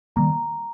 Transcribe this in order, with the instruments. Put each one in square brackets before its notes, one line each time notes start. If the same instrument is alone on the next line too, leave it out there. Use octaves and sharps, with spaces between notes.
[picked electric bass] D#3 G3 A#3 [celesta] A#5